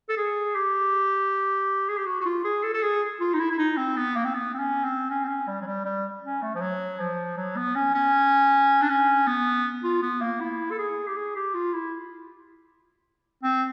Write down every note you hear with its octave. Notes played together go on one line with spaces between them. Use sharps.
A4
G#4
G4
G#4
G4
F#4
F#4
F4
G#4
A4
A4
G#4
F4
D#4
E4
E4
D#4
C4
B3
A#3
C4
B3
C4
C#4
C4
C#4
C4
C#4
G3
F#3
G3
G3
C#4
A3
F3
F#3
F3
F#3
B3
C#4
C#4
D4
C#4
B3
F4
B3
A#3
E4
A4
G#4
G4
G#4
G4
F4
E4
C4